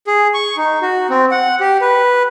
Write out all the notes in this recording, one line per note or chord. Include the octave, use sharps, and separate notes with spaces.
G#4
C#6
D#4
F#4
C4
F#5
G4
B4